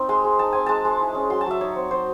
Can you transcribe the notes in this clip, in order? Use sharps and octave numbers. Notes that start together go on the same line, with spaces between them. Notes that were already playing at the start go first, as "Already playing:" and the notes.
Already playing: C4 D#4
G#3 C6
G#3
D#4 A5
C4 G#5
G#3 A5
G#3
E4
C#4
F#3 C6
A5
F#3 E5
D#4 C#5
C4
F#3 C5